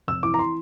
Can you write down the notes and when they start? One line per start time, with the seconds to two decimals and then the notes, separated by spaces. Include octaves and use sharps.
0.08 F1 E6
0.23 E3 D6
0.34 A#5
0.39 C6